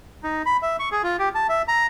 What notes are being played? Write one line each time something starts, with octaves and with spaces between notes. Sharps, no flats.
D#4
B5
E5
C#6
G#4
F4
G4
A5
E5
A#5